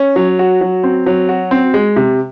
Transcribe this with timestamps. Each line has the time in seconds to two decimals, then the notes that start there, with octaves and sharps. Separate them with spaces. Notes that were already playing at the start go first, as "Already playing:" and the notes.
Already playing: C#4
0.16 F#3
0.39 F#4
0.61 F#3
0.84 C4
1.06 F#3
1.29 F#4
1.51 C4
1.74 G#3
1.96 C3